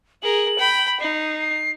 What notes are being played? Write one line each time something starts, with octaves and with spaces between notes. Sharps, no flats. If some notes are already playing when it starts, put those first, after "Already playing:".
G#4 A#4 F#7
G5 B5
D#4 C7
C7